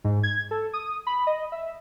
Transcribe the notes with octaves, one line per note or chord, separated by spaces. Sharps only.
G#2
G#6
A4
D#6
B5
D#5
E5